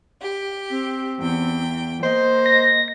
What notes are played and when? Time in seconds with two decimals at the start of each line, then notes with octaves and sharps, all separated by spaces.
0.21 G4
0.70 C4
1.20 E2 G5
2.03 A#3 C5 D#5
2.46 A#6